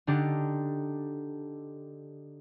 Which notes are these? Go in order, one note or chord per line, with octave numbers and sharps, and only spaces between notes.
D3 D4 D#4 G4